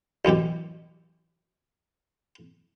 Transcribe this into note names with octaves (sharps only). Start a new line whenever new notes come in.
A1 F#2 B2 G4